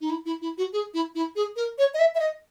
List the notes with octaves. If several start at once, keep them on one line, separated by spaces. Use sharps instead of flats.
D#4
E4
E4
E4
F#4
G#4
E4
E4
G#4
A#4
C#5
D#5
E5
E5
D#5